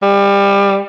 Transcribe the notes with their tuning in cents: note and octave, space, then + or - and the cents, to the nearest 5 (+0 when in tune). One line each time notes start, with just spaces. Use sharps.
G3 +25